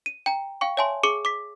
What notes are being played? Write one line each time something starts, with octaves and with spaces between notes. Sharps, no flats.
D#7
G5 A#5
F5 G5 C#6
C#5 E5 G#5 A5 C6
G#4 C#6 D6 C#7
D6 B6